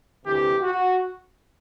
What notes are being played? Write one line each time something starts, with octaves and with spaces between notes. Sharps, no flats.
D2 C3 E3 G4
F#4